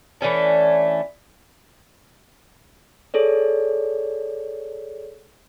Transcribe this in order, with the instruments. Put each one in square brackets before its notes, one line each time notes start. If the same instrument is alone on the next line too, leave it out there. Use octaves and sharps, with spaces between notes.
[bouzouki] E3 A3 C#4 D4
[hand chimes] G#4 A4 C#5 D5